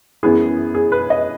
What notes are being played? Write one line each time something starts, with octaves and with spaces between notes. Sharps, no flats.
F#2 E3 B3 E4 G#4
G#4
B4
D#5